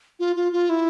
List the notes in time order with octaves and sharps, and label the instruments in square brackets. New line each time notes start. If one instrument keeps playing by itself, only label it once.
[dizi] F4
F4
F4
E4